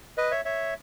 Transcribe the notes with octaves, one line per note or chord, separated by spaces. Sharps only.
B4 D#5
C#5 E5
C#5 E5